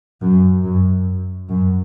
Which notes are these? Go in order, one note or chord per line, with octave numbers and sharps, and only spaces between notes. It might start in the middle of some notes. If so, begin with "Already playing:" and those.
F#2
F#2
F#2